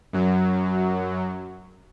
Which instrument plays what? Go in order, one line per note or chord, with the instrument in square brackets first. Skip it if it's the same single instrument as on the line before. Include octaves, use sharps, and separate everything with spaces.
[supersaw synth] F#2 F#3